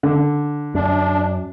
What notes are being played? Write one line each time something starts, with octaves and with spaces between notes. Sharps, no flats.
D3
F#2 D4